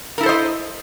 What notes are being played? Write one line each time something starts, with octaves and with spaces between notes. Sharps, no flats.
E4 A4 A#4 C5 D#5